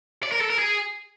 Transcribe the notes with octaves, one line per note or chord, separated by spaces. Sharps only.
D5
A#4
A4
A#4
G#4